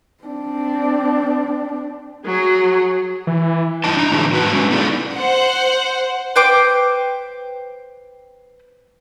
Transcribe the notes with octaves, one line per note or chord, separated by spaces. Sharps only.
C4 D4
F#3 G#4
E3
G2 D#4 E4 D#5 A5
D4 A#5
A2 D3 E3 D#4 F#4 G#4
G#2 F#4 B4 A5
F#3 G#3 B3 C#4
B3 D#4 E4 G#4 A4 D5
C5 F#5
B4 C5 G5 D6